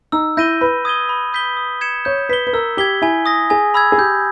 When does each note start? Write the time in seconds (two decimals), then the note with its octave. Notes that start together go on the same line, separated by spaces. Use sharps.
0.12 D#4 E6
0.37 E4 G6 A#6 D#7 G7
0.61 B4 B5
0.85 D#6 G#6 D#7 G7
1.09 B5
1.33 D#6 G6 B6 G7
1.57 D#6
1.81 G#6 C#7 E7
2.05 C#5 G6
2.29 B4 B6 G7
2.47 B4
2.53 A#4 E6
2.77 G4 G#6 B6 G7
3.02 E4 G#5
3.26 D#6 A#6
3.50 G#4 G#5
3.74 B5 E6 G#6
3.92 G#4
3.98 G4 G6